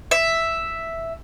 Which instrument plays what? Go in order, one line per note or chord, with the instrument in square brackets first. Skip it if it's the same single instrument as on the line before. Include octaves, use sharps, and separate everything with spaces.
[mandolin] E5